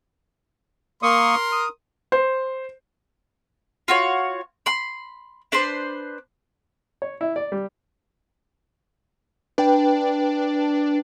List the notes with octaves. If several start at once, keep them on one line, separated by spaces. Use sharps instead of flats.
A#3 A#4 C6 C#6 D#6
D#6
C5
F4 F#4 C#5
B5 C6
D4 B4 C5 C6
C#5
E4
D5
G3
D4 B4 G5